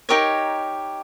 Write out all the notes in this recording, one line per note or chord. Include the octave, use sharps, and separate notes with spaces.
D#4 G4 A#4 C#5